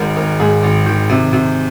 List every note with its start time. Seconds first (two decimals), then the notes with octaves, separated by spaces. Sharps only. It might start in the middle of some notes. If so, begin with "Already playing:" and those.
Already playing: G#1 G#2 G#4 A#4
0.16 G#1 A#4
0.40 G#2 G#4
0.63 G#1
0.86 D#3
1.09 C3
1.33 C3